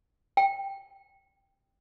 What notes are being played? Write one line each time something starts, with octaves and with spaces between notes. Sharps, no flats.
G5